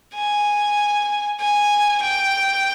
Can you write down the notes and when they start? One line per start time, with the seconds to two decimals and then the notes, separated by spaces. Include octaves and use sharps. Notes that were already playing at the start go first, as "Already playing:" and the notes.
0.14 G#5
1.40 G#5
2.02 G5